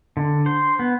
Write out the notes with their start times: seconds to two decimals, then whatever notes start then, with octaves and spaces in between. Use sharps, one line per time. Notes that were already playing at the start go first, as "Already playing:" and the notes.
0.17 D3
0.46 C5
0.79 B3